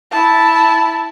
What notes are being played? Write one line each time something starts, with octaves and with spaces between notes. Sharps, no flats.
E4 A5